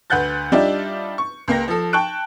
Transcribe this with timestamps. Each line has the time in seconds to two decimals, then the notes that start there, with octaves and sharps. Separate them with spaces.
0.10 D2 B4 F#5 F#6 G6 A6
0.52 G3 D4 D#4 F4 D5 E5
1.18 C#6
1.48 C#2 A#3 G5 A#6
1.68 F3 A4
1.93 G5 A5 C#6 F#6 D7